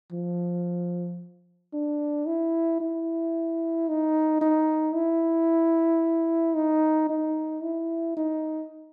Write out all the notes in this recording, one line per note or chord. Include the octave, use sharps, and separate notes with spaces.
F3
D4
E4
E4
D#4
D#4
E4
D#4
D#4
E4
D#4